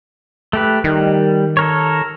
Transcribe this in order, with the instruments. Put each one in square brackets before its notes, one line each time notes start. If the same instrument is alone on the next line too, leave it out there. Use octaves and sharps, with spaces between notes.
[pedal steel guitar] A3 G4 B4
[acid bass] D#3 [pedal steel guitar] G3
[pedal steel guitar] A4 A#4 C#5